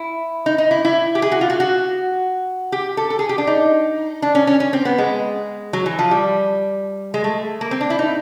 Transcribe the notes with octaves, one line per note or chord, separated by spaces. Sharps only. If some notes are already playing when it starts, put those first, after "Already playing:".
Already playing: E4
D#4
D#4
E4
E4
G4
G#4
F#4
F4
F#4
F#4
G4
A4
A4
G#4
G4
D4
D#4
D4
C#4
C#4
C#4
C4
B3
G#3
F#3
E3
F3
G3
G#3
A3
A#3
C4
D4
E4
D#4